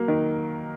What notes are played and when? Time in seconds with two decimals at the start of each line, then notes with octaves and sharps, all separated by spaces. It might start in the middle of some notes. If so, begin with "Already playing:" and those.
Already playing: F#3 A#3
0.08 D#3